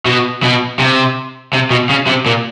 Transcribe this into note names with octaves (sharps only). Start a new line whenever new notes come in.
B2
B2
C3
C3
B2
C#3
C3
A#2